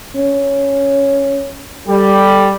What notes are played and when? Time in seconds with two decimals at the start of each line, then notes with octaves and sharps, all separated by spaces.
0.17 C#4
1.87 G3 A4